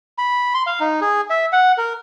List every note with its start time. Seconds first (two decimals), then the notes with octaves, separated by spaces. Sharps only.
0.18 B5
0.54 C6
0.66 F5
0.80 D#4
1.01 G#4
1.30 E5
1.53 F#5
1.78 A#4